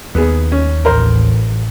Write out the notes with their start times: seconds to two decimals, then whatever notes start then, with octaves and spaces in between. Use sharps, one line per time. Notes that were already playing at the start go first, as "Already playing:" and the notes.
0.15 D#2 B3 G#4
0.52 C#4
0.85 A1 A#4 C5